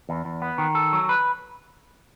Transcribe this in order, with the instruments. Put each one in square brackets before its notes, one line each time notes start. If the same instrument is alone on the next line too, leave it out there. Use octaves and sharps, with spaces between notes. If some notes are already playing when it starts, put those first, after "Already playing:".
[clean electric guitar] E2
E2
B3
D#3
A4
F#3
B4